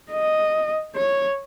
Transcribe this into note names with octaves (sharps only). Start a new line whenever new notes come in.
D#5
C#5